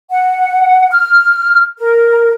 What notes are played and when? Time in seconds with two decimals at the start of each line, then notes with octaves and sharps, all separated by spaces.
0.11 F#5
0.91 F6
1.78 A#4